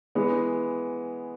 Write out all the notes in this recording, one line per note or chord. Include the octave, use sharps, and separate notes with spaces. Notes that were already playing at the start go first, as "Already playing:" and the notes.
E3 G#3 B3